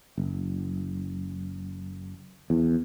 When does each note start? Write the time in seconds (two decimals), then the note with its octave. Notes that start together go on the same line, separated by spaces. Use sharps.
0.18 F#1
2.50 E2